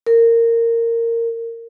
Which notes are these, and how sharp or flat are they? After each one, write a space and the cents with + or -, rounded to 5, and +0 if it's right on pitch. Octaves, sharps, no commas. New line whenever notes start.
A#4 -15